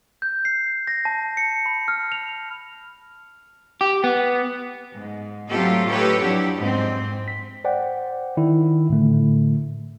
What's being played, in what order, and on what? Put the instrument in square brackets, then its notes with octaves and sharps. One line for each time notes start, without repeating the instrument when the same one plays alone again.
[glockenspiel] G6
C7
A#6
A5
C#7
B5
F6
F7
[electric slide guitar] G4
B3
[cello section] G#2
F#3 A3 C4 F4 G4 A4
A2 D#4 G4 A4 B4 C#5
F2 F#3 D4 E4 G4
G#2 C4
[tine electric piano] B6
C5 D5 F#5 G5
D#3 E4
A2 D3 A3